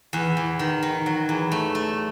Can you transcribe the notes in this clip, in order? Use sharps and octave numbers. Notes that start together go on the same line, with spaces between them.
E2
E2
D#3
D#3
F#3
E2
A3
A3